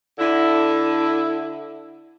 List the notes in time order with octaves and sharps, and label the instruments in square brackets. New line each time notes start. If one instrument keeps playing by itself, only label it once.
[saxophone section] D3 E4